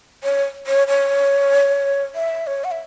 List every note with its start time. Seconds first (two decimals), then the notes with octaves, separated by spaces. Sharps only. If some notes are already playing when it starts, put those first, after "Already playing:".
0.24 C#5
0.67 C#5
0.88 C#5
2.15 E5
2.47 C#5
2.64 F#5
2.71 E5